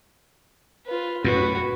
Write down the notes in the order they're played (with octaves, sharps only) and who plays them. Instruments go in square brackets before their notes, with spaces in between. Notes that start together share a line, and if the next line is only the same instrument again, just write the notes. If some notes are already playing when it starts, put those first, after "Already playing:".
[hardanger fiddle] F4 B4
[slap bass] F#2 A2 [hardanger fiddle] F#4 B4